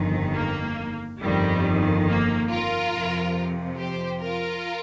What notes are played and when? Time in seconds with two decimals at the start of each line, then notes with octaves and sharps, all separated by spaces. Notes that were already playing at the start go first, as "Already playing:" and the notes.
Already playing: G1 F2 D#3
0.35 A#3
1.21 G1 F2 D#3 G3
2.06 A#3
2.49 F4 A#4
2.93 F2 C3 F3
3.78 G4 C5
4.21 F4 A#4